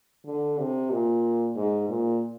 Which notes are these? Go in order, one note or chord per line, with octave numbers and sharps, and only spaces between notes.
D3
C3
A#2
G#2
A#2